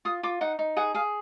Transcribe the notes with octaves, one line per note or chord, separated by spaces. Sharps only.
F4 D#6
F4 D6
D#4 F#5
D#4
G#4 F#5
G#4 F5